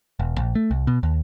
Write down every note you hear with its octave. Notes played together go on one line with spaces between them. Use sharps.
E1
A#1
A3
C2
B2
D#2